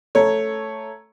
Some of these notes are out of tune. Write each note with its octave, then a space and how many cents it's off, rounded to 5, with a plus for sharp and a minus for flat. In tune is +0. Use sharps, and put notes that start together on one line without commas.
A3 +0 C#5 +0 A#5 +0